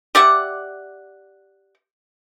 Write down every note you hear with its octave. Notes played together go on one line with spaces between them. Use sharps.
G4 D5 E5 F#5